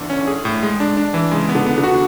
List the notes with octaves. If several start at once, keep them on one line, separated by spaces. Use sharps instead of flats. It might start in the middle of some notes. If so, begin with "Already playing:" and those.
Already playing: E2 D3 E3
C#4
G#4
A2
G#3
D4
D4
E3
C#3 G#3
B3
D3
B3
D3
F#4